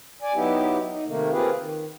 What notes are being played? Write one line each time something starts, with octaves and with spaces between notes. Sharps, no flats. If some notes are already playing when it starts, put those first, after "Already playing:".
D5 G#5
F#3 B3 D#4 E4 G4
D#4
C3 D#3 A3 A#3
A#3 C4 F4 G4 G#4 B4
D#3